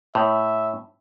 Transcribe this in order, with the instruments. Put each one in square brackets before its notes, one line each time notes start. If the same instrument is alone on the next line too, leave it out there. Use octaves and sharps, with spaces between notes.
[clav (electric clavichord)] A2 [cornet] E5